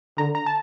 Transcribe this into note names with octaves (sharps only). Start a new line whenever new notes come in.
D3 A#5
A#5
A5